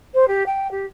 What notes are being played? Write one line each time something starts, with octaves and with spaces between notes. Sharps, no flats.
C5
G4
G5
G4